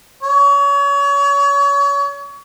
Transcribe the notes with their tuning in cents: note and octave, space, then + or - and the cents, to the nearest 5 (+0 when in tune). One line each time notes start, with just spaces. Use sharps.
C#5 +30